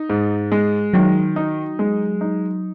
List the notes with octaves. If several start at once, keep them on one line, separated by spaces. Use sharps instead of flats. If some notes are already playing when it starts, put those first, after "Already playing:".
Already playing: D#4
G#2
G#3
D#3 F#3
D#4
G#3
D#4